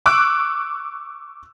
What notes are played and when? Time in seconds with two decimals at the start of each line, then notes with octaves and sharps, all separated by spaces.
0.06 C#6 D6 E6 F#6 D7